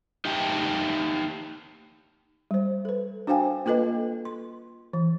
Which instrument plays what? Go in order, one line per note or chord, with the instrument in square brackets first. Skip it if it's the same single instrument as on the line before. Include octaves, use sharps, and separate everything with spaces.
[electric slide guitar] D#4 G4 E5 G5 A5
[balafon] G3 C5
A4 B4
D4 F#4 C5 F5 G5 G#5
A#3 F4 A4 B4 D#5
C6
E3